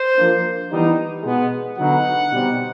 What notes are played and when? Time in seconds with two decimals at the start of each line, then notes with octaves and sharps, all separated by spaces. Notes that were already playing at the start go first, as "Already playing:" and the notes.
Already playing: C5
0.16 F3 A#3 D4
0.71 E3 G3 B3 D#4
1.23 B2 G#3 B3
1.77 D3 F#3 B3 D#4 F#5
2.31 B2 G3 C4 D#4